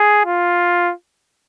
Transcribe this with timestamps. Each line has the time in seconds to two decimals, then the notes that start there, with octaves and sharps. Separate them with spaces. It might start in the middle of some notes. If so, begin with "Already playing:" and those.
Already playing: G#4
0.25 F4